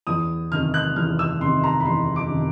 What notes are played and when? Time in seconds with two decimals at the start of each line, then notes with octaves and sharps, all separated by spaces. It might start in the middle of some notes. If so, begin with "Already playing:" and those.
0.07 E2 D#6
0.51 C3 D#3 F6
0.74 F#6
0.96 E2 F6
1.19 E6
1.41 C3 D#3 C6
1.64 A#5
1.80 B5
1.86 E2 C6
2.16 D6
2.31 C3 D#3